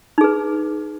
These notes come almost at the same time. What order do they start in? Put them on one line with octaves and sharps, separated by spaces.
D#4 G#4 B4